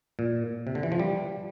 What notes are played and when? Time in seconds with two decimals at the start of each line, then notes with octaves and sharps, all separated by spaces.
0.19 A#2
0.67 C3
0.75 D3
0.83 E3
0.92 F3
1.00 G3